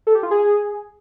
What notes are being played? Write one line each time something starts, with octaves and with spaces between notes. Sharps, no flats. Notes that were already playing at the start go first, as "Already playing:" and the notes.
A4
G4
F4
G#4